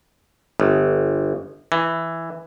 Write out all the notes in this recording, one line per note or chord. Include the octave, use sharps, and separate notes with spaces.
G1
E3